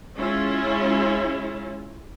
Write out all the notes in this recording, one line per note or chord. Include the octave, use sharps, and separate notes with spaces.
G#3 C#4 E4 F4